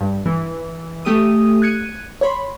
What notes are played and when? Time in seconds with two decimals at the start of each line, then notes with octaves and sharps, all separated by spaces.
0.01 G2
0.26 E3
1.05 A3 G4 D#6 D#7
1.62 F#6 G#6 C#7 D#7
2.21 C#5 B5 C6